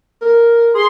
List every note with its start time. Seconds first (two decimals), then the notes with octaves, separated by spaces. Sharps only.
0.22 A#4
0.75 G#4 C6